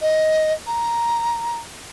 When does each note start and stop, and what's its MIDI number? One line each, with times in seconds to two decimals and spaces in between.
0.02 0.53 75
0.67 1.59 82